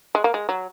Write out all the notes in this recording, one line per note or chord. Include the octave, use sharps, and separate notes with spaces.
G#3
A#3
G#3
F#3